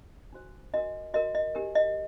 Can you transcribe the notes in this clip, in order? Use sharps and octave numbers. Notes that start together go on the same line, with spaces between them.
D4 F#4 C5
D4 F#4 A#4 D#5
F#4 A#4 D#5
D#5
D4 G4 A#4
D#5